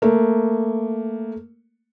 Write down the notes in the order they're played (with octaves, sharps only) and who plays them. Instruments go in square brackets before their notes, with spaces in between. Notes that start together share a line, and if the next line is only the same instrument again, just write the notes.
[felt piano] A3 A#3